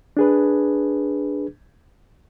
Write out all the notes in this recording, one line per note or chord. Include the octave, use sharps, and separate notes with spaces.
D4 G#4 B4